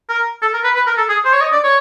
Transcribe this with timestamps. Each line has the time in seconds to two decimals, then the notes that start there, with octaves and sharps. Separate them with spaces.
0.09 A#4
0.42 A4
0.53 A#4
0.64 B4
0.75 B4
0.87 A#4
0.98 A4
1.09 G#4
1.25 C5
1.33 C#5
1.41 D#5
1.52 D5
1.64 C#5